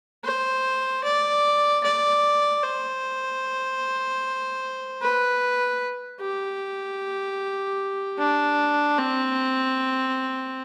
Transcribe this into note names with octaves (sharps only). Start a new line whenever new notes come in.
C5
D5
D5
C5
B4
G4
D4
C4